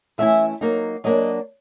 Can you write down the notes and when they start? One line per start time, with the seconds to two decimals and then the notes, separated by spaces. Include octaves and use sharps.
0.18 E3 A3 C#4 E4 E5
0.61 F#3 A#3 D#4
1.04 F#3 A#3 D4 D#5